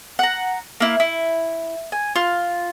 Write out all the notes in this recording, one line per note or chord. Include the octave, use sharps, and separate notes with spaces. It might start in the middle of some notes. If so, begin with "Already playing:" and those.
F#5 A#5
A#3 E4
E4
G#5
F4